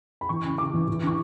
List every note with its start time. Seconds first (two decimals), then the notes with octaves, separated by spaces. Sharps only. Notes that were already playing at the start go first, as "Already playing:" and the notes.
0.21 B5
0.29 E3 C#6
0.44 C#3
0.58 C#3 D6
0.74 E3
0.88 E3
1.03 D4 C#6